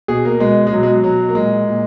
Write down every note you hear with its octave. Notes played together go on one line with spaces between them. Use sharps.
B2 G#4
A#3
B2 G#3
G#3
B2 F#3
G#3
F#3
B2 F#3
A#3
A#2 G#3
A#2